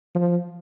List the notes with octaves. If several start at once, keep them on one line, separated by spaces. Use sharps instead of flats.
F3